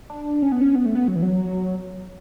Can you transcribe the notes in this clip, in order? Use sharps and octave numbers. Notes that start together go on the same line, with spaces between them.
D4
C#4
B3
C#4
B3
A3
B3
F#3
E3
F#3